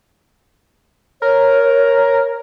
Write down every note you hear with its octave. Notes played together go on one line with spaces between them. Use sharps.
A#4 C#5